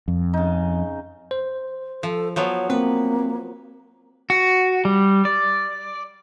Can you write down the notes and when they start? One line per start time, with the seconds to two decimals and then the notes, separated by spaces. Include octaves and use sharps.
0.08 F2
0.33 C#3 D#4
1.31 C5
2.03 F3 A4
2.36 F3 F#3 B3 C#5
2.70 A#3 C4 B4
4.30 F#4
4.85 G3
5.25 D5